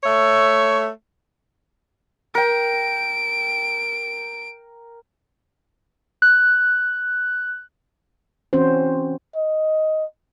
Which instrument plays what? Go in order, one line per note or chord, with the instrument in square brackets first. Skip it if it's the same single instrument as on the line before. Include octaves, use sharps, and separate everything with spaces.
[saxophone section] A3 C#5 E5
[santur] A#4 G5 [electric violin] D7
[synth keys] F#6
[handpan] E3 C4 C#4 F#4 C5
[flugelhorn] D#5